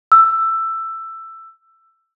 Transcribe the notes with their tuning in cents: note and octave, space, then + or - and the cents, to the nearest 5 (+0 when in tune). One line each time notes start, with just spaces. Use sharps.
E6 +10